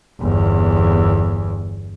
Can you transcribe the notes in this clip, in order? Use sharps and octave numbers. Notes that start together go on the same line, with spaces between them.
G1 E2